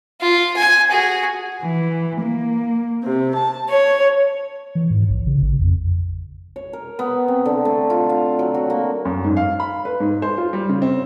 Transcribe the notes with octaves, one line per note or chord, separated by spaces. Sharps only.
F4
G#5
F#4 G#4
E3
A#3
C3
A5
C#5
E3
G#2
A#1
C#3
A1
F2
C#5
A#4
B3
C4
D3
A3
F4
F5
F#3
F#4
A#3
F#2
G#2
F5
B5
B4
G#2
C5
F4
G3
C#3
C4